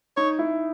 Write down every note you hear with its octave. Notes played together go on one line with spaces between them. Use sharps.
D#4 C#5
E4